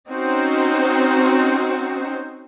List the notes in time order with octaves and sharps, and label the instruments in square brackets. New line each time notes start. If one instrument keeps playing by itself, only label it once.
[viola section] C4 C#4 D#4 F#4 C5